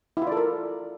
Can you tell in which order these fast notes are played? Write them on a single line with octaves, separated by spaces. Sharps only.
E4 F4 D5 A4 A#4